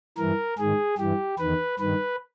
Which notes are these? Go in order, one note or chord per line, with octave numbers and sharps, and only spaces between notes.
G2 E3 A#4
G#2 D#3 G#4
G2 E3 G4
E2 D#3 B4
G2 D#3 B4